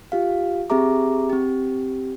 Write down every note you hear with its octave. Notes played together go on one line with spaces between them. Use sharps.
F4 G4 F5
C4 G4 G#4 E5 A#5 D6
C4 G4